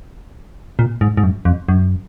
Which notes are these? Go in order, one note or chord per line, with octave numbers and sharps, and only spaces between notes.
A#2
G#2
G#2
F#2
F2
F#2